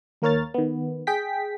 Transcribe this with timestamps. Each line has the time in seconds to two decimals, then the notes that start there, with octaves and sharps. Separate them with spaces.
0.22 D#2 A#3 A#4 C#5 F6 A6
0.54 D#3 B3
1.07 G#4 G5 B6